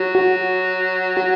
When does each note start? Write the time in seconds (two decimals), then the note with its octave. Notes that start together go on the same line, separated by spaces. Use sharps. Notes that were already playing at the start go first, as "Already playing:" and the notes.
Already playing: F#3 F#4
0.15 F#4
1.17 F#4